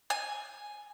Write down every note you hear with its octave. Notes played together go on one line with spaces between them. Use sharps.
G#5